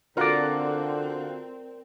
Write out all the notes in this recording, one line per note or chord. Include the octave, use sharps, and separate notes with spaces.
D3 C4 F4 F#4 A4 A#4 D5